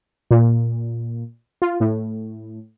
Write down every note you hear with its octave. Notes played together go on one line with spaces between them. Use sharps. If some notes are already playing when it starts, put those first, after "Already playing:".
A#2
F4
A2